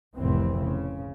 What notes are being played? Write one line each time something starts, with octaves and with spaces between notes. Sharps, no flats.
F1 C2 A2 C3 E3 C4
C#3